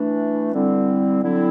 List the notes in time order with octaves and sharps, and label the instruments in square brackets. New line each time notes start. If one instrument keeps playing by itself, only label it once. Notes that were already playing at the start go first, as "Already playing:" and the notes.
Already playing: [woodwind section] E3 A3 D4
D3 G3 C4 E4
D3 F#3 C4 E4